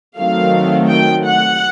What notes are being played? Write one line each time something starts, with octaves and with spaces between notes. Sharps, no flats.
D#3 F#3 A3 C4 F5
G5
F#5